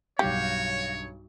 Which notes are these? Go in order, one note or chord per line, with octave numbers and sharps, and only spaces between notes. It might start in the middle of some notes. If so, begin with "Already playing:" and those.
B1 G2 F#4 G4 C#5 F5 C#6 G6